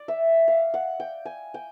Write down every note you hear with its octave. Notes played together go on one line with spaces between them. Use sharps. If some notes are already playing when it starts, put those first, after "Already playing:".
Already playing: D5
E5
F5
F#5
G5
G#5
G5